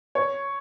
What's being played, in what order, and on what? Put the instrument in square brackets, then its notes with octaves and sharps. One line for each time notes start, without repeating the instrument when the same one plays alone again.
[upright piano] C#5